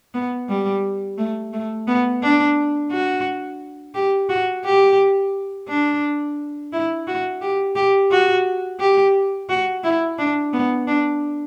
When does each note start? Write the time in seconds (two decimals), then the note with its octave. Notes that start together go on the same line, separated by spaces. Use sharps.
0.14 B3
0.49 G3
1.18 A3
1.53 A3
1.87 B3
2.23 D4
2.92 F#4
3.95 G4
4.29 F#4
4.65 G4
5.68 D4
6.72 E4
7.07 F#4
7.41 G4
7.75 G4
8.11 F#4
8.80 G4
9.49 F#4
9.84 E4
10.18 D4
10.53 B3
10.87 D4